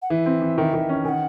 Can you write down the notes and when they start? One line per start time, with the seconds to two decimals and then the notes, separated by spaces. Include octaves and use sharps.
0.02 F#5
0.10 E3 E5
0.26 C4
0.42 E3
0.58 D#3
0.74 D#3
0.89 C#4
1.04 D#3 F#5 G#5